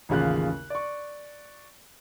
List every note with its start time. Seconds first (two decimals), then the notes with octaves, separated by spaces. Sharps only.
0.09 A1 D#2 C#3 F4 F#6
0.70 D5 C#6